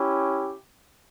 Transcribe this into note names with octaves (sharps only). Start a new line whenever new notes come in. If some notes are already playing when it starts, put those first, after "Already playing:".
Already playing: C#4 E4 G4